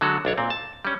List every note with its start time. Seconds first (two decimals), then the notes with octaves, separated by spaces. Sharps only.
0.01 D3 F#3 G#3 F#4 A4
0.25 B1 D4 C#5
0.38 A#2 C4
0.50 A5
0.85 G3 C#4